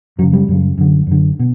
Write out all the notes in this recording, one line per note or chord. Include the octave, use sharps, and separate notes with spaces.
F#2 C#3 F#3
G3
F#2 C#3
F#2 D3
F#2 D3
B2